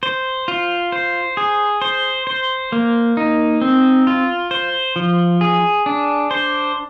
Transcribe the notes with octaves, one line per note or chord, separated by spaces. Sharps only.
C5
F4
C5
G#4
C5
C5
A#3
D#4
C4
F4
C5
F3
G#4
D4
C5